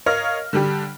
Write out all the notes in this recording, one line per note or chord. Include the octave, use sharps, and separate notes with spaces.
A#4 C#5 D#5 F5 F6 A#6
D3 G3 D4 G4